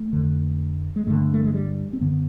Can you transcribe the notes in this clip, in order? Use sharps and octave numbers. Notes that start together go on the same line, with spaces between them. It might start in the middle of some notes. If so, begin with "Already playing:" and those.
Already playing: A3
F2 D3
G#3
G2 D3 A3
A3
G#3
G3
C4
F#2 D3 B3